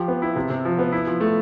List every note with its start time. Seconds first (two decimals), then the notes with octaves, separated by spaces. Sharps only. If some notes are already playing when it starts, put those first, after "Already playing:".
Already playing: F3 G4
0.08 B3
0.22 E4
0.36 C3
0.50 C3
0.65 F3
0.79 B3
0.92 E4
1.07 F3
1.21 A3